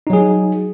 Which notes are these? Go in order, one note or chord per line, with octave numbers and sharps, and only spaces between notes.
F#3 D#4 G#4